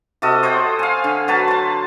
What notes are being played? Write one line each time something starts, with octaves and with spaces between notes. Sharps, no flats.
C3 F#4 A4 D#5
C5 C#5 F#5 G5
F5 G#5
D3
F#3 F#4 B4 A5
C5 A5